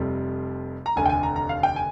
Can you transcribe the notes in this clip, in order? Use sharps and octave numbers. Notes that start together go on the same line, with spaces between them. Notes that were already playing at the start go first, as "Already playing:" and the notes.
Already playing: F1 F2 C3 G3
A#5
F1 D#2 D3 G#5
G5
G#5
A#5
A#5
F5
G5
G#5